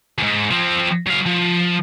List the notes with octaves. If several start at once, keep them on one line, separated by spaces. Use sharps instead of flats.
E2 G#2
F3 C4
F#3 F5
F3